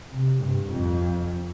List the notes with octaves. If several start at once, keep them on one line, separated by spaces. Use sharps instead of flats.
C3
G2
F2